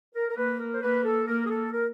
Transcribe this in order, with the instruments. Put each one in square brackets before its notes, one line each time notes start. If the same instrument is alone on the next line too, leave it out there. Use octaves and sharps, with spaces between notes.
[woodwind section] A#4
A#4
[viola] A#3 [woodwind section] B4
[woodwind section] A#4
C5
[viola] A#3 [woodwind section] B4
[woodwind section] A4
[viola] A#3 [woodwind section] A#4
[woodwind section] G#4
A4
A#4